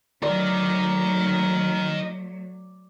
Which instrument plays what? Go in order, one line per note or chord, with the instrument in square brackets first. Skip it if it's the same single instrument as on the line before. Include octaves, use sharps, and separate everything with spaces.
[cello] F#3 A3 [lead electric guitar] D#4 A#4 [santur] D5